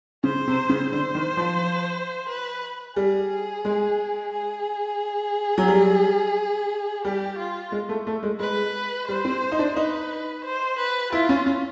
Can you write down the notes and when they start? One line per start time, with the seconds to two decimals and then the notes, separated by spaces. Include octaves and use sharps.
0.24 C#3 C5
0.47 C3
0.69 C#3
0.92 D3 C5
1.15 D#3
1.37 F3
2.29 B4
2.96 G3 G#4
3.65 G#3
4.32 G#4
5.58 F#3
5.68 G3
7.05 G3 G4
7.39 F4
7.72 G#3
7.89 A3
8.07 A3
8.23 G#3
8.40 G#3 B4
9.08 G3 C5
9.25 C4
9.52 D#4
9.59 D4
9.76 D#4 B4
10.45 C5
10.79 B4
11.13 E4 F4
11.29 C#4
11.46 C#4